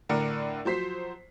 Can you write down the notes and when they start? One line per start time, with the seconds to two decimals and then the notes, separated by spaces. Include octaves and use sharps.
0.09 A2 D3 A#4 D5 C#7 D7
0.65 F3 F#3 C5 B6 C7